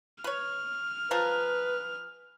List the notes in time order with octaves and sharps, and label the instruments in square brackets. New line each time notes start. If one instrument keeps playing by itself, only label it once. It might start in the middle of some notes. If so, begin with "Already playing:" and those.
[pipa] B4 C#5 [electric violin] F6
[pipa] F3 G#4 A#4 [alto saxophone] B4